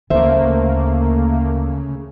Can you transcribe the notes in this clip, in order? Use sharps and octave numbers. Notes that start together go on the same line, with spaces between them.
D2 C#3 A3 A#3 C5 E5